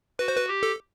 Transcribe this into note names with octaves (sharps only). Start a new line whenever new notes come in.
F#4 B4
C5
B4
G4
A4